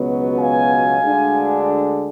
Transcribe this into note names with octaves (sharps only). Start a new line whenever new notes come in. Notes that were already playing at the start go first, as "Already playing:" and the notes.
Already playing: C#2 B2 F#3 B3
F5 G#5
D2 D3 G#3 D4